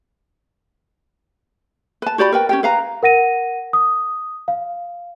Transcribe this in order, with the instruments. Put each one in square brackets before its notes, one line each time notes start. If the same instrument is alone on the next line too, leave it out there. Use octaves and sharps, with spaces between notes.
[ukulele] B4 A5
F#4 G4 D5 B5
A#4 B4 G5
C#4 G4 G5
B4 F5 A#5
[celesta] A#4 F#5 A#6 D#7
D#6
F5